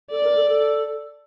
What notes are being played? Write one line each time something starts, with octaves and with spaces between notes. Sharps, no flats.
A4 D5
A#4
A4
A4